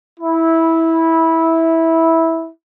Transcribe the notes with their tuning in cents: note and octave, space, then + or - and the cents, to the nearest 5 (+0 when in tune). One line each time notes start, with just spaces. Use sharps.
E4 -15